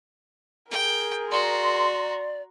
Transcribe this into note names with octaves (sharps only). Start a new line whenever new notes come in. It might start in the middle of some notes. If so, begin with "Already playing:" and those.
G#4 A#4 G5
F#4 D5 A#5 C6